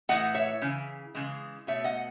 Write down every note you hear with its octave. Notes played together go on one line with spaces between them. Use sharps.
A2 E3 A3 D#5 F#5
C#5 E5
C#3 E3
C#3 E3 G#3
B2 A3 C#5 E5
D#5 F#5